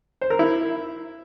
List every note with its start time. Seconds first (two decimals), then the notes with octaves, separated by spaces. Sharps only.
0.21 C5
0.30 A#4
0.39 E4